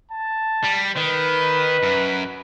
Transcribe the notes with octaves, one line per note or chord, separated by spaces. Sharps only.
A5
G3
D#3 B4
F#2